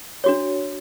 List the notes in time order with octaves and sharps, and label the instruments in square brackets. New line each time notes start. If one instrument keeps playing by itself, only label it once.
[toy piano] D4 F#4 C#5